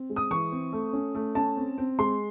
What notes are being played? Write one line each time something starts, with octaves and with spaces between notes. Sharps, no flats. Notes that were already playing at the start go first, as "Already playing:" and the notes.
Already playing: C4
G#3
D#6
E3 C#6
C4
A3
C#4
A3
C#4 A5
C4
C4
G#3 C6